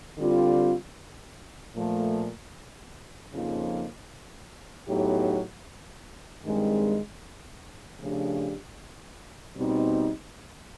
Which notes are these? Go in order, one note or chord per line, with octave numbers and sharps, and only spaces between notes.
D3 G3 C4 F4
A#2 F3 A3
F2 C#3 F3 A#3 D#4
A2 F#3 B3 D#4 G4
G2 D#3 G#3 C4
C#3 F3 A3 D4 G4
B2 G3 C4 D#4